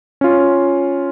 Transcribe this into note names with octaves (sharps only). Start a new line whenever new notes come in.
C#4 F4